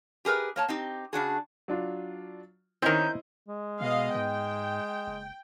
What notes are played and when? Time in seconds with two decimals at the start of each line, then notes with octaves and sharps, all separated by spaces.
0.25 G4 G#4 A#4 B4 E5
0.56 A#3 C#5 A5
0.68 C4 D#4 G4
1.13 C#3 D4 F#4 G#4
1.68 F#3 D4 F4
2.82 D#3 C4 C#4 E4 A#4 C5 D#5 G6
3.48 G#3
3.81 B2 B3 D#5 F5
4.15 G#2 G5
5.07 F#1